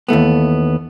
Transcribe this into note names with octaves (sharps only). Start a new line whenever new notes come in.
D#2 E3 A3 B3